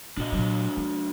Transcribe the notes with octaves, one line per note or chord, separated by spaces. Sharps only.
A#2 D4 F#4 D#5
A#2 F#3
F#3